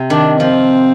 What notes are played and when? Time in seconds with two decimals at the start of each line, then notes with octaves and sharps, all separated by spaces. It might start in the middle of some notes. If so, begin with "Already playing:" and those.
Already playing: C3
0.10 D#3 D4
0.40 F3 C4